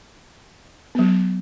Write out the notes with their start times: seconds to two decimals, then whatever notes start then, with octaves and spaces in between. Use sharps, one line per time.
0.95 F#3 B3